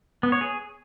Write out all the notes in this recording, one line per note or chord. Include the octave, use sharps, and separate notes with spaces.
B3
C#5
G#4